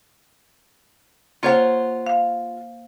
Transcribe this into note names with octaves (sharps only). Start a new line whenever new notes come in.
A#3 F4 C5 C#5 F#5
F5